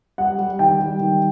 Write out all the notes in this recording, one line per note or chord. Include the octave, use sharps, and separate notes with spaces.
G3 F#5
G3
D#3 G5
G3
D#3